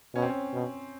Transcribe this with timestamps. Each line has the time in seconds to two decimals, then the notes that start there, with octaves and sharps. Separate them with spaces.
0.15 B2 C#4
0.22 C4
0.30 C#4
0.53 B2